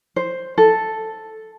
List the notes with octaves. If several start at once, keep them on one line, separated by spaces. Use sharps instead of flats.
C5
A4